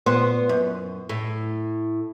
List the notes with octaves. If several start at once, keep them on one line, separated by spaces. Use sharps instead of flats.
A#2 B3 C5
F#2
A2